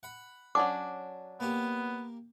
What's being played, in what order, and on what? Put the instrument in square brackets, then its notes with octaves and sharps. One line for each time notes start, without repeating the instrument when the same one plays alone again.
[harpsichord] F#5 B5
[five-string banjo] F#3 C#4 D4 [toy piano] D6
[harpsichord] A#3 G4 [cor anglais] B3